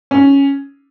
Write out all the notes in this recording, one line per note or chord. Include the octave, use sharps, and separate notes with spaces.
C#4